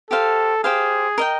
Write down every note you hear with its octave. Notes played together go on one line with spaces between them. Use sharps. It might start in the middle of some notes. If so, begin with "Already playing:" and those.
G4 A4 C5 F5
G4 G#4 C5 F5
A#4 D#5 G5